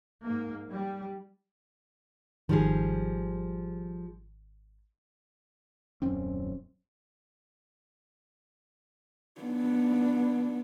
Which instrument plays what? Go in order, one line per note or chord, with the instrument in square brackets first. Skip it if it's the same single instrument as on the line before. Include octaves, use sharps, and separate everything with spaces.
[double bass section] G#2 A#3
G3
[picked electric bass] G#1 D#3 [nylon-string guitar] F3 G3 G#4
[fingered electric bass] D#1 F#2 C4 C#4
[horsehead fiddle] B3 D4